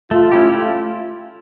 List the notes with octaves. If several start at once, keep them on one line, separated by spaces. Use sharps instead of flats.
A3 F4
C#4 E4 G4
A3 F4